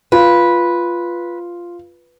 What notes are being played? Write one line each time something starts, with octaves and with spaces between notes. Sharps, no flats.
F4 B4